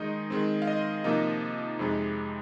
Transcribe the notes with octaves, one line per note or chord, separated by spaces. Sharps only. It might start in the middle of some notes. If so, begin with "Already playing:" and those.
Already playing: D#3 G#3 D#4 D#5
D#3 G#3 C4
F5
D#5
C3 F3 A#3 D#4
F2 C3 G#3 D#4